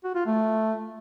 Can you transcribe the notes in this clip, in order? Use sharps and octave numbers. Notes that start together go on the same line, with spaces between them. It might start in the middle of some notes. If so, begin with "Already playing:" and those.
F#4
F4
A3